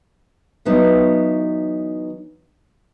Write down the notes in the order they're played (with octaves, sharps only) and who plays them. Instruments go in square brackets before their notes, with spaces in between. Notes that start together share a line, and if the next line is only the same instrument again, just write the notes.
[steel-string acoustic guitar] E3 F#3 B3 D#4